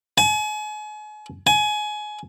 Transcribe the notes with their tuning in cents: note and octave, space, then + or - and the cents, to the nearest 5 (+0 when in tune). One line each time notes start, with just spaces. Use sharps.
G#5 +40
G#5 +25